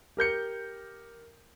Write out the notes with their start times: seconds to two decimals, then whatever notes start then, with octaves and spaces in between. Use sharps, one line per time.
0.17 G4 A#4 G6 C#7